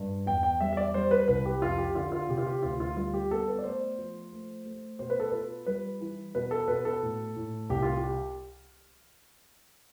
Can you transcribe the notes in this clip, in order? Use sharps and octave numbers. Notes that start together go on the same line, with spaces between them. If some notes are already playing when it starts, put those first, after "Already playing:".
Already playing: G2
E2 G5
G5
G3 E5
E5
D5
G3 C5
B4
C2 B4
G4
F2 F4
G4
D3 F4
F4
C3 G4
F4
G4
D2 F4
F4
G3 F4
G4
B3 A4
B4
D5
A3 C5
F3
A3
A3
B2 C5
B4
A4
F4 B4
G3 B4
E3
B2 B4
A4
B2 B4
A4
A2
A2
C2 G4
F4
G4